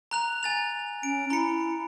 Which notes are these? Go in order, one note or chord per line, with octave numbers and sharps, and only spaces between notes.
A#5 F#6 F7
G#5 A6 F7
C#4 D7
E4 A#5 C#7